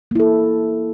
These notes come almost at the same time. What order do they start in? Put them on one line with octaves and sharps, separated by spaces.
A#3 E4 A4